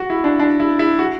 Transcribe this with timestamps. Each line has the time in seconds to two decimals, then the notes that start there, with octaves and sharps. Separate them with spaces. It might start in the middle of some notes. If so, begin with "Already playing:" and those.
Already playing: F#4
0.10 E4
0.24 D4
0.39 D4
0.60 E4
0.79 E4
0.99 F#4